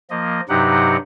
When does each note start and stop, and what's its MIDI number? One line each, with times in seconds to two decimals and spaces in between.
0.11 0.41 53
0.11 0.41 58
0.11 0.41 75
0.49 0.96 43
0.49 0.96 48
0.49 0.96 54
0.49 0.96 63
0.49 0.96 67
0.49 0.96 78